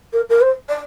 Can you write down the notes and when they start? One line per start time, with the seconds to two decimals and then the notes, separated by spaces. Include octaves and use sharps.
0.13 A#4
0.29 A#4
0.41 C5
0.69 D5